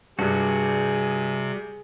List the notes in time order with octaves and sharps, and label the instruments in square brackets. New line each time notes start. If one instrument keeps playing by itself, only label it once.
[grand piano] G2 [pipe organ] C3 [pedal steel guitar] G3 F#4 [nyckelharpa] G#4